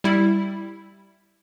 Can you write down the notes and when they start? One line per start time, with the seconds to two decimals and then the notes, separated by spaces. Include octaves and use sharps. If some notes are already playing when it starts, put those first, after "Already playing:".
0.04 G3 E4